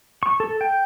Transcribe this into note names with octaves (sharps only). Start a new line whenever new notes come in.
C#6
A4
G5